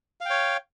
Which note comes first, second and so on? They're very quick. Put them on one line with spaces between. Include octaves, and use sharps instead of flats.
F5 G5 C#5